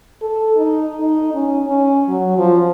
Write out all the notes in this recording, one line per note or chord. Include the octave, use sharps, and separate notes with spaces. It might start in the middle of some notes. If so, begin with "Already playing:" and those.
A4
D#4
D#4
C#4
C#4
F#3
F3